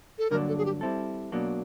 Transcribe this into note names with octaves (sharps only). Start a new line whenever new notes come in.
A4
G2 D3 F#3 A#3 D4 A#4
A4
G#4
G4
G3 C4 E4 A4
B2 F#3 A#3 D4